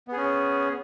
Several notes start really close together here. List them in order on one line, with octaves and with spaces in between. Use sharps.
B3 G#4 C#4